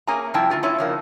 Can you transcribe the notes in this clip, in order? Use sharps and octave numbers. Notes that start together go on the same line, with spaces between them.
A#3 C#4 G#4 G#5 A#5
C3 F3 G3 E4 G5 A5
D3 A3 F4 G4
C#4 E4 F4 C#5
C#3 F3 A#3 D#4